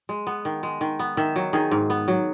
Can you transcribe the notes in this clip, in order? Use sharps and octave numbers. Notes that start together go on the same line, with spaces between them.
G#3
B3
D#3
G#3
D#3
B3
D#3 E5
F#3
D#3 G#4
G#2
B3
F#3